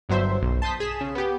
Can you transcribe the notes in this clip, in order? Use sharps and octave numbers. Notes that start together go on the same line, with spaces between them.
G1 G2 F#3 C5 E5 C6
B1
A5 C6 D#6 G6 B6
G#4 B6 E7
C#3
B3 G4